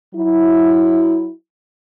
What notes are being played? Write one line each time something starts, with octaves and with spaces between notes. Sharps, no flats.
F#3 E4